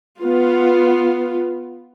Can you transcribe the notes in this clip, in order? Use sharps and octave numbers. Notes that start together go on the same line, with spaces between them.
B3 F4